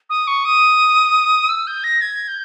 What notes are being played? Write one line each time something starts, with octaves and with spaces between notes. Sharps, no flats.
D#6
C#6
D#6
E6
G6
A#6
G#6
G6